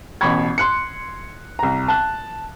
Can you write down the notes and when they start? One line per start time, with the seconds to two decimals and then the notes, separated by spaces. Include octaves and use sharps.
0.21 A1 B2 B5 C#6 G#6
0.58 C6 F#6 C#7
1.59 C2 A#5
1.88 A5 F#6